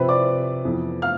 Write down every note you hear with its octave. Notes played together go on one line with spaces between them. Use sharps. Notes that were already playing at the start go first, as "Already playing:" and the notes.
Already playing: C3 F3 C4 B4 B5
D5 D6
F2 E3 B3
F5 F6